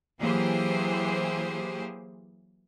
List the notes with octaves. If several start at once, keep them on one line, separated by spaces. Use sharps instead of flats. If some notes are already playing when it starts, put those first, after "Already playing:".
E3 F#3 A#3 G4 G#4 C5